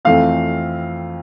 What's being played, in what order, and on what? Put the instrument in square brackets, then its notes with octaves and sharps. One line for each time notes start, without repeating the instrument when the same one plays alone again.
[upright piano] F2 E3 A3 C4 F5